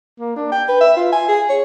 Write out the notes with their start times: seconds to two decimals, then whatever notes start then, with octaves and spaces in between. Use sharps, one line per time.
0.19 A#3
0.36 D4
0.52 G5
0.68 B4
0.81 E5
0.96 F4
1.12 G#5
1.28 G#4
1.49 C#5